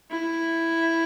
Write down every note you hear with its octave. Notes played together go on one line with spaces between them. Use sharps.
E4